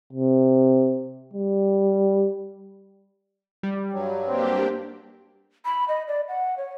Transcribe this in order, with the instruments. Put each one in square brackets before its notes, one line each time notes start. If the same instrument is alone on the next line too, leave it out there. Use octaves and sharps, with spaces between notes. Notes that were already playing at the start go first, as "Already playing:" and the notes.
[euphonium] C3
G3
[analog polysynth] G3
[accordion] G2 F#3
[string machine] A#3 D4 G4 [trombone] C4
[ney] B5
D#5
D5
F#5
C#5